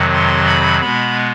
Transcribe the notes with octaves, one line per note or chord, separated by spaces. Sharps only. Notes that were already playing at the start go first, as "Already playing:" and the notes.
Already playing: F2 C3 D#3 F#3
C6
B5
B2 G#3 B3 B5